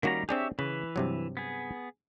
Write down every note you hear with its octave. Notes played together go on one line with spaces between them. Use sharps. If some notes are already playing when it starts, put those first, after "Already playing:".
D#3 G3 A#3 C#4 F#4 A#5
C4 D4 G4 G#4 C#5 E5
C#3 E3 B4
G2 C3 F#3
B3 G#4